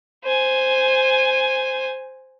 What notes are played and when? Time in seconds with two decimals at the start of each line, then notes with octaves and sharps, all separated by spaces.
0.25 C5 G#5